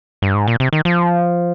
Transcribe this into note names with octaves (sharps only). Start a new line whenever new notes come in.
G2
G#2
A#2
C3
D#3
F3